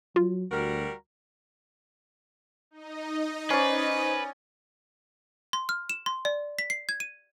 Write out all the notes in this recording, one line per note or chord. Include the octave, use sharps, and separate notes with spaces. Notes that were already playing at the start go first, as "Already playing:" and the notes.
F#3 F4
D2 G3 F#4 A#4
D#4 D#5
C#4 B4 C5 D5
C6
F6
E7
C6
D5
B6
C7
G#6
D#7